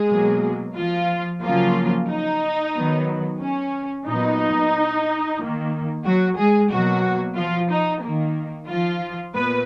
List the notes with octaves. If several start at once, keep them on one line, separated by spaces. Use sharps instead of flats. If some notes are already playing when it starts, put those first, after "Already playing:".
Already playing: G#3 G#4
B2 F#3 A#3
F3 F4
C#3 F3 F#3 A#3 F4
D#4
D#3 F#3 B3
C#4
A#2 F#3 B3 D#4
D#3 A#3
F#3 F#4
G#3 G#4
B2 F#3 A#3 F#4
F3 F4
D#4
D#3 A#3
F3 F4
A#2 B3 B4